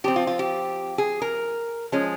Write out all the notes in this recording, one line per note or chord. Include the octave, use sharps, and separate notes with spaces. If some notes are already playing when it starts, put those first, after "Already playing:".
F3 C4 G4
F4
F4
G4
G#4
A#4
F3 G#3 C#4 G#4